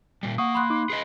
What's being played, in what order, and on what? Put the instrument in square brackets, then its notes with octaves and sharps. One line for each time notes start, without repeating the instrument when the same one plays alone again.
[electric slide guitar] A#2 G3
[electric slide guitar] A#3 [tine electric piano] F#5 C#6 D#6
[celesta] B5 C6 F#6
[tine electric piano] D#4 D6
[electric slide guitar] G#4 B4 D#5 [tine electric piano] C7